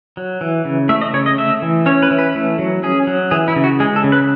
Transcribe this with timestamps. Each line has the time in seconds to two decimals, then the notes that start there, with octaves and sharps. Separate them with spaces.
0.17 F#3
0.41 E3
0.65 C#3
0.89 A3 E5
1.01 D#5
1.14 C#3 C#5
1.26 D#5
1.38 A3 E5
1.62 E3
1.86 C#4 C#5
2.03 B4
2.11 E3
2.18 B4
2.35 A3
2.59 F#3
2.83 C#4 G#4
3.07 F#3
3.31 E3 G#4
3.48 E4
3.56 C#3
3.64 F#4
3.80 G#3 G#4
3.96 A4
4.04 C#3
4.12 B4